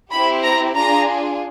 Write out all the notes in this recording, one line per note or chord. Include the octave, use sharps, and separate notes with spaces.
C4 E4 G4 B5
A#5
D4 F4 G#4 A#5